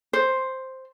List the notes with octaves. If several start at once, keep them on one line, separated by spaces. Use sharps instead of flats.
C5